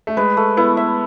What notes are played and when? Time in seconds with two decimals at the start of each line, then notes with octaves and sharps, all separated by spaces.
0.07 A3
0.17 G#3 B4
0.37 A3
0.57 B3 E4
0.77 E5